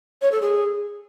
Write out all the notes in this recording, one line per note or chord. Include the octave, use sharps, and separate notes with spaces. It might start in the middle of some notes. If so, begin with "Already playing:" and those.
C#5
A4
G#4